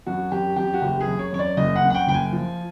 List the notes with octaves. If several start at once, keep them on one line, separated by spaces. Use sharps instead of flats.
F#2 F#4
F#2 G4
F#2 G4
F#4
F#1 G4
G#4
F#2
C#5
F#2 C#5
D5
F#1 D#5
F#5
F#2
F#5
G5
F#1 G5
G#5
F3